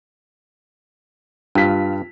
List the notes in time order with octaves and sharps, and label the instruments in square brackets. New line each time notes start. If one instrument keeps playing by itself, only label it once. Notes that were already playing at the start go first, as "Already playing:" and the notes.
[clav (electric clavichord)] G2 [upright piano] F4 B6